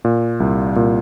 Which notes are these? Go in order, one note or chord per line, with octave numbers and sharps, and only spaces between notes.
A#2
C2
A#2